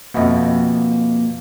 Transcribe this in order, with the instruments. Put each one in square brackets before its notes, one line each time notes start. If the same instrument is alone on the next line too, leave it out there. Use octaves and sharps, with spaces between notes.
[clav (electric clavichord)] F2 B2 [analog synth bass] A#3 [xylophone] D#5 E5 F#5